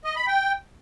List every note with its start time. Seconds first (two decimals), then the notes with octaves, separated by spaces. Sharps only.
0.04 D#5
0.16 B5
0.27 G5